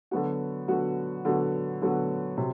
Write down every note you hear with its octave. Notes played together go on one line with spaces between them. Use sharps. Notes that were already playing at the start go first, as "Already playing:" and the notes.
D3 F#3 B3 F#4
D3 F#3 B3 F#4
D3 F#3 B3 F#4
D3 F#3 B3 F#4
C3 F#3